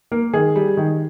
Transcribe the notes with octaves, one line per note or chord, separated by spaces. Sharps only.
A#3 A#4
D#3 G#4
G3
D#3